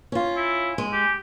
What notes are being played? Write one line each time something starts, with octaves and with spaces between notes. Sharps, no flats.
C#4 F4
E4
G#3
G4